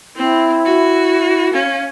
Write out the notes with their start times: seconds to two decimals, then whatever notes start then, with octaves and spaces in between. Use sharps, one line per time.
0.16 C4 E4
0.65 F#4
1.53 C#4 F5